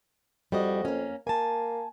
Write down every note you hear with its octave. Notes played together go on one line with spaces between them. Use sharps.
F2 G3 F#4 D#5
A#3 C#4
A#3 G#5 A5